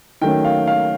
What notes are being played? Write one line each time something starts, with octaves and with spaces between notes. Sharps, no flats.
D#3 F#3 A3 C#4 G5
F5
F5